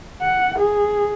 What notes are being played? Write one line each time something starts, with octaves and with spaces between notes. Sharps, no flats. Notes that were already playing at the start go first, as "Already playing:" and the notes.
F#5
G#4